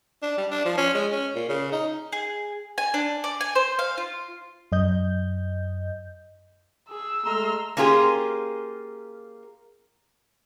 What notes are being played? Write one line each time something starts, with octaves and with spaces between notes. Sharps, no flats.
D4
G3
D4
F3
C#4
G#3
C#4
A#2
C#3
D#4
G#4
G#5
D4
D5
G#5
C5
F5
F4
F#2 D#5 G6
G#4 E6
G#3 A3 A#5 C6 F6
A#3 C#4 F4 G4 G#4